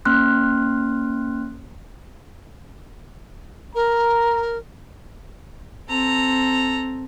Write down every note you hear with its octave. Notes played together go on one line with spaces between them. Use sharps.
A#3 C#4 C6 F6 F#6
A#4 A#5
C4 A4 A#5